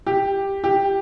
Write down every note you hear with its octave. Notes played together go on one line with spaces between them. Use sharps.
G4
G4